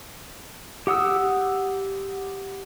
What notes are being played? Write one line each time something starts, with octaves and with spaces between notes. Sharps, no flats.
G4 F#5 D#6 E6